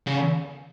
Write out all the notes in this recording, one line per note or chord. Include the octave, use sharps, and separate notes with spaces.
C#3